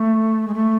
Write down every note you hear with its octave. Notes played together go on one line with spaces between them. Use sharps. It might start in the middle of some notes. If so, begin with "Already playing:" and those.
Already playing: A3
G#3
A3